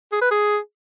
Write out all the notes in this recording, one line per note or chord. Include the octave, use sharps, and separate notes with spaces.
G#4
B4
G#4